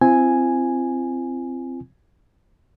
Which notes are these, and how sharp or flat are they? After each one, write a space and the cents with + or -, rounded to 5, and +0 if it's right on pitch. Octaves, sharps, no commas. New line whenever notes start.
C4 +0 F4 -45 G#5 +0